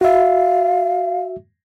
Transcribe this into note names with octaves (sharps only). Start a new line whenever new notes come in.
F#4 E5 F5